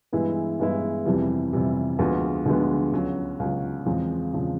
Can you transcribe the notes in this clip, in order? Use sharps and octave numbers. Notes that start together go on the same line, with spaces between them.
G2 E3 G#3 B3 E4
G2 E3 G#3 B3 E4
F2 C3 E3 G3
F2 C3 E3 G3
D2 D3 F3 G#3 B3
D2 D3 F3 G#3 B3
C#2 C#3 F#3
C#2 C#3 F#3
E2 C#3 F3 G#3 C4
E2 C#3 F3 G#3 C4